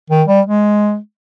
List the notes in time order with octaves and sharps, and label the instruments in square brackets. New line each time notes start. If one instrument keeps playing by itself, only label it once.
[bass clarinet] D#3
G3
G#3